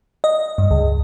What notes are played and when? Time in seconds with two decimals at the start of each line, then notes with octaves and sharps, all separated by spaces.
0.24 D#5
0.58 G2
0.71 C#2